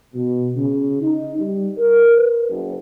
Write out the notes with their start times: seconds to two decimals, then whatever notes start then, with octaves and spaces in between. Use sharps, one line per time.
0.14 B2
0.56 C#3
1.01 D#4
1.39 G3
1.78 A#4
2.17 B4
2.49 F#1